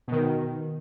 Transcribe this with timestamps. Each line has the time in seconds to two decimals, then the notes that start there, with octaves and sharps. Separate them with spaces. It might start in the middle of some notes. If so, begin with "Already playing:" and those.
0.08 B2 D#3